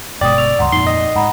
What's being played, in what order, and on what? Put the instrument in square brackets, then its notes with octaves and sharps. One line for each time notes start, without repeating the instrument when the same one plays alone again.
[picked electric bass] G1 B2 G#3 [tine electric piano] D5 [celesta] G5 D#6
[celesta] C#6 E6 F7
[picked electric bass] C#2 G2 [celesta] F#5 A#5 C6
[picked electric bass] F2 A#2 [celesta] D#4 D5 [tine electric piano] C6
[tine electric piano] D#5
[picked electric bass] G#2 [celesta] F#5 A#5 B5